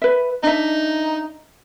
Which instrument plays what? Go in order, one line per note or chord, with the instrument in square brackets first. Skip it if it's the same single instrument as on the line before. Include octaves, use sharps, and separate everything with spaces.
[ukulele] B4 E5
[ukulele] D4 E5 [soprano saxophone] D#4